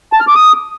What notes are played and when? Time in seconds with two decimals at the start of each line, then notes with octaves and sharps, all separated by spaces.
0.13 A5
0.20 F6
0.28 D6
0.35 D#6